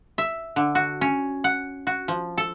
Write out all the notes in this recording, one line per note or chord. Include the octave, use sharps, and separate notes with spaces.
E5
D3
F#4
C#4
F#5
F#4
F3
A4